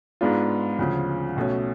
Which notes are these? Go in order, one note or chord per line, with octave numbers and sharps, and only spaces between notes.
G#2 G#3 B3 D4 F4
D2 C#3 F3
B1 B2 A3 C#4